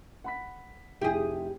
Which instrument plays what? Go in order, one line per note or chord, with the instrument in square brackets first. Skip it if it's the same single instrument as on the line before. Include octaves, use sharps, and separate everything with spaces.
[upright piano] F#5 B5 B6
[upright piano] F1 E4 [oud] G4 G#4